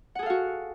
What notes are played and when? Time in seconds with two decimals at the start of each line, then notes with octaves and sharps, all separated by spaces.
0.15 F#5
0.19 G#4
0.23 A4
0.26 F5
0.30 F#4